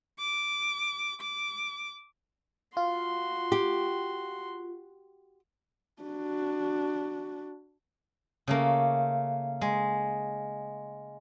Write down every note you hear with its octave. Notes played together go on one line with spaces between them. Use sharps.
D6
D6
F4 F#4 C6
G4
D4 F#4
C#3 A3 A#3
G#3